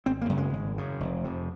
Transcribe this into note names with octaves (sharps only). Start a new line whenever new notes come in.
G#1 C4
A#3
F#2 C#3
G#3
G#1
F#2 C#3
F1
F2 C3